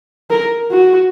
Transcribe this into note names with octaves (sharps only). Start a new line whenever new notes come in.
A#4
F#4